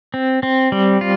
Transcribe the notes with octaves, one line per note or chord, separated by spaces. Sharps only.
C4
C4
G3
F4